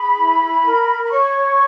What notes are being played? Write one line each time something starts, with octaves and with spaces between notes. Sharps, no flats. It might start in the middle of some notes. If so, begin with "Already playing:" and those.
Already playing: G#4 B5
E4
A#4
B5
C#5 C#6